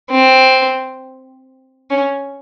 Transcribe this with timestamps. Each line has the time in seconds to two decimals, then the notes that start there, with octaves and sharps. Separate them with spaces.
0.10 C4
1.90 C#4